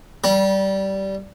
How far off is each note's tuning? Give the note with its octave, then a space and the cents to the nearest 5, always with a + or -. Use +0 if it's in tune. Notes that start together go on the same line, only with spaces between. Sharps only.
G3 -15 B5 -45